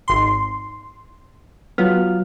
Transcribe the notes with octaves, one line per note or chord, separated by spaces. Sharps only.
G#1 C6
F#3 B3 F4 F6